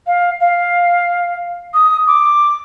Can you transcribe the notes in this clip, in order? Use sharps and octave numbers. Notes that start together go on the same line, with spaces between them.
F5
F5
D#6
D6